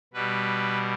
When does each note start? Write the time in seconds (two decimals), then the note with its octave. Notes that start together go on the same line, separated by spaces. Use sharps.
0.14 B2 G3 B4